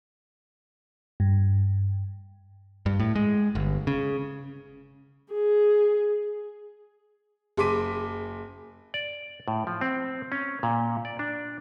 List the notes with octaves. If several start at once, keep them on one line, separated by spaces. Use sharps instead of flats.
G2
G2
A2
G#3
G1
C#3
G#4
F#1 G#4 C6 D6 B6 D#7
D5
A2
F3
C4
C#4
A#2
D5
D4